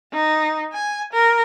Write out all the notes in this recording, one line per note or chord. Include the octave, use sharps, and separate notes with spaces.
D#4
G#5
A#4